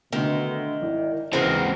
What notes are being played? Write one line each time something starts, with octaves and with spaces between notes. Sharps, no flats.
B2 D3 D#3 A3
G#1 E4
D#2 C#3 E3 G#3 C4 F#4 A#4